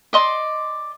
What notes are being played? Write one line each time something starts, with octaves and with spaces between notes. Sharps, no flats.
D5 D#5 C6